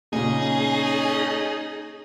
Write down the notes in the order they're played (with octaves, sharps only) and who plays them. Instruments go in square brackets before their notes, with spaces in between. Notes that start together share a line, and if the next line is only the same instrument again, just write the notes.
[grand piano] A#2 C#3 [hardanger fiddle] C#4 D#5 [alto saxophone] D#4 [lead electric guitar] G#4